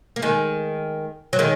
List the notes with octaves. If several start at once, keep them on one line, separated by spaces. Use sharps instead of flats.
A#3
D#3 G#3
F#3
D#3 G#3